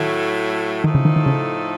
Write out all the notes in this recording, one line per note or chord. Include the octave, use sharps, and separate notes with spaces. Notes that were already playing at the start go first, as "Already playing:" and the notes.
Already playing: A2 D#3 F#3 A3
A2 D#3 F3 A3 D#4 A4
C#3
D#3
D#3
C#3